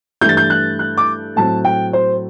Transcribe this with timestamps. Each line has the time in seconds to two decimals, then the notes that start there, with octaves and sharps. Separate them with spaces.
0.21 G2 E3 A3 G6
0.29 A6
0.37 G6
0.50 F#6
0.79 F#6
0.98 D6
1.36 A2 F#3 C4 A5
1.65 G5
1.93 C5